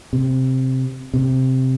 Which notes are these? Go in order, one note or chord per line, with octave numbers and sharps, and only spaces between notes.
C3
C3